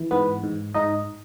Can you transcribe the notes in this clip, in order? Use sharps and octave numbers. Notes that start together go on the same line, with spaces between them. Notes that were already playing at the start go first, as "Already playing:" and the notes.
Already playing: E3
G#2 B3 B4
G#2
G#2 D#4 D#5